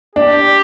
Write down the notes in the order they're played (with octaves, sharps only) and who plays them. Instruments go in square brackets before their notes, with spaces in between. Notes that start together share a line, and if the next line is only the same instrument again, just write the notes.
[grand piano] D4 [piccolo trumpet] G4